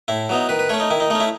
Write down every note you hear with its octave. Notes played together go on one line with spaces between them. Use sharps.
A2 E4
F#3 B3 D#4
D#3 B4
B4
A3 C#4 C#5
D#4
D#3 E4
D#4
A3 C#4 D#4
E4